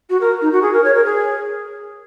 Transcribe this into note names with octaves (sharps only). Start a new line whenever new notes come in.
F#4
A#4
D#4
F#4
G#4
A#4
C#5
A#4
G#4